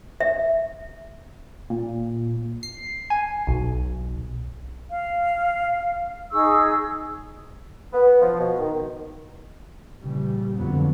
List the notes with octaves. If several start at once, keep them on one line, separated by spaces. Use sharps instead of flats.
E5
A#2
C7
G#5
B1
F5
D#4 G#4 C#6 E6
B3
F3
B2
D#3
A#2 C#3 E3 G3
F2 G#2 D3 F3 F#3 B3